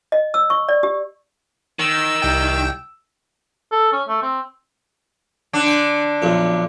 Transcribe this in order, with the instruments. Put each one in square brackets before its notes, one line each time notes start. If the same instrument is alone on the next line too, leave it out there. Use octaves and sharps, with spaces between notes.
[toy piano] D#5
E6
C#6
D5
G4
[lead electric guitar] D#3 [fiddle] E6
[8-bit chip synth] C2 G5
[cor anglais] A4
C#4
A3
C4
[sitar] D3 D4
[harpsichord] G5 G#5
B1 F2 A#2